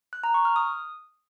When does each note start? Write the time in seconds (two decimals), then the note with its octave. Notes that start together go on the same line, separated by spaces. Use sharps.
0.13 F#6
0.24 A#5
0.34 C#6
0.45 F6
0.56 D#6